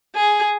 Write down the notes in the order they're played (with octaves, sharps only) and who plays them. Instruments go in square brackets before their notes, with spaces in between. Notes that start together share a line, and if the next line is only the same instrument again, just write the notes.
[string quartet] G#4